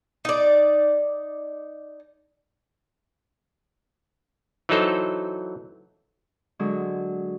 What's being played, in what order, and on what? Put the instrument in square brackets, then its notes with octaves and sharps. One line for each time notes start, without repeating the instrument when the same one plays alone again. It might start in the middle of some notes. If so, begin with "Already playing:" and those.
[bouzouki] D#4 D5
[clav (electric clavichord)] E3 F#3 D#4 A4 C5
[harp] D3 F#3 G#3